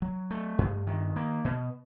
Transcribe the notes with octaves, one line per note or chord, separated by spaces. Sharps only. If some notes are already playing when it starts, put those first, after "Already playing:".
F#3
A3
G2
D#3
A#3
B2